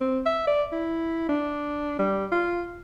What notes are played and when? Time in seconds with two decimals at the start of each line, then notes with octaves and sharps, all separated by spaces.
0.01 C4
0.26 E5
0.47 D5
0.72 E4
1.29 D4
1.99 G3
2.32 F4